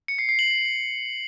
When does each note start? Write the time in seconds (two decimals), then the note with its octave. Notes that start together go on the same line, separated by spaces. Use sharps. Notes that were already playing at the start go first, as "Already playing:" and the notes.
0.08 C#7
0.19 C7
0.29 C7
0.39 F#7